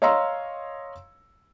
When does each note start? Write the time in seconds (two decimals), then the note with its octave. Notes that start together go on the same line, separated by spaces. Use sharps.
0.02 C#5 D#5 F5 A#5 C6 E6